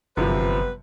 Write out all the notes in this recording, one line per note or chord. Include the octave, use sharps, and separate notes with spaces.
G1 F#2 C3 F3 G3 B3 B4